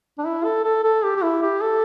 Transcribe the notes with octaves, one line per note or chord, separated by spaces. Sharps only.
D4
E4
A4
A4
A4
G4
G4
E4
G4
A4